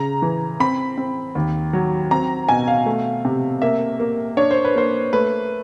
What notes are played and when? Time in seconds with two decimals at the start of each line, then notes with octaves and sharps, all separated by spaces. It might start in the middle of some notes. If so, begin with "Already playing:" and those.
Already playing: C#3 A#5
0.22 E3
0.60 C4 B5
0.98 C4
1.35 D#2
1.73 F#3
2.11 C4 A#5
2.49 B2 G#5
2.68 F5
2.86 A3
3.25 C3
3.62 A#3 E5
4.00 A#3
4.37 D4 C#5
4.51 C5
4.65 B4
4.76 A#3 C5
5.13 A3 B4